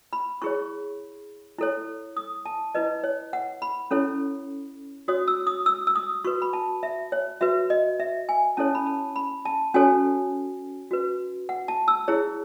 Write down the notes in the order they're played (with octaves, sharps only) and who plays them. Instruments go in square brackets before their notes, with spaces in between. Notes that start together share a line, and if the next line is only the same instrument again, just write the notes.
[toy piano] B5
E4 G#4 C#5 C#6
E4 A4 C#5
D#6
A5
E4 B4 D#5
C#5
F#5
B5
C#4 E4 A4 C#5
F#4 C#5 D#6
E6
D#6
E6
E6
D#6
F#4 B4 C#6
B5
A5
E5
C#5
F#4 B4 E5
D#5
E5
G#5
C#4 E4 A4 C#5 A5
B5
A5
B5
A5
C#4 F#4 A4 C#5 G#5
F#4 B4
F#5
A5
E6
E4 G#4 C#5